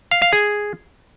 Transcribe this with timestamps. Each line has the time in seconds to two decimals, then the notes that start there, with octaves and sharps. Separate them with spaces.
0.11 F5
0.22 F5
0.33 G#4